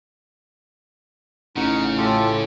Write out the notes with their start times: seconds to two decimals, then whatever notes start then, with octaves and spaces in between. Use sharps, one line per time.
1.56 A1 C#3 C#4 D#4 F#5
1.97 A2 F4 G4 A4